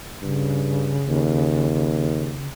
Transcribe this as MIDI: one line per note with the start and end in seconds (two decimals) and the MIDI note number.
0.22 0.98 43
0.22 2.48 49
1.08 2.40 39